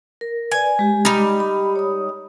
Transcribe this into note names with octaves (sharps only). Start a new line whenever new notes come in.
A#4
B4 D5 G#5
G#3 G4
G3 D#4
B5
C#5 D#6